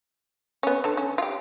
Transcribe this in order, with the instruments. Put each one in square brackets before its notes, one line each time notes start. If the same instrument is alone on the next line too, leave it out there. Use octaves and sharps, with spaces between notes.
[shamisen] B3 C#4
D3 A4
C#4
F4 G4